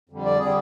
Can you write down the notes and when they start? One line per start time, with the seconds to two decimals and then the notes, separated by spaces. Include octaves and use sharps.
0.10 F2 D3 G3
0.25 D5
0.39 D3 G3 G#4